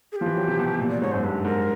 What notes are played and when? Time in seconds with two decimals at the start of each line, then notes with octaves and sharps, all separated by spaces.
0.12 G#4
0.16 G4
0.21 F3
0.26 E3
0.37 F#3
0.48 C3
0.59 B2
0.80 A#2
0.90 D5
1.01 G#2 C#5
1.12 F#2 C5
1.23 G2 B4
1.44 G#2 A#4